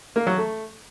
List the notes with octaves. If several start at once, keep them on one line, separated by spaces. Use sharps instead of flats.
A#3
F#3
A3